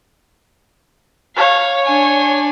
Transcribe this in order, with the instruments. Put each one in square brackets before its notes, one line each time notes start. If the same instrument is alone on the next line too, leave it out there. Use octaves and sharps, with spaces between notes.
[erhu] C#5 [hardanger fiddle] F5
[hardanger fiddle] D4 G#5